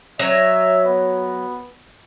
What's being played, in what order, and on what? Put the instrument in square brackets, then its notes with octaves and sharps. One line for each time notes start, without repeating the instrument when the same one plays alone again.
[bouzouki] F#3 C#5 [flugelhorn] E5
[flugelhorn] B3